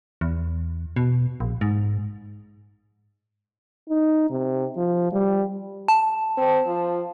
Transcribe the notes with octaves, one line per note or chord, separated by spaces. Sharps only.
E2
B2
A#1
G#2
D#4
C3
F3
G3
A5
C4
F3